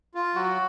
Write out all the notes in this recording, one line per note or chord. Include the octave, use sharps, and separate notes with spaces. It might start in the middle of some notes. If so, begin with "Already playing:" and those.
F4
F#3 F#4